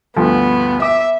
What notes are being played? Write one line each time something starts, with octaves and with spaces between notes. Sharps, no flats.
D2 G2 F3 B3
E5 D6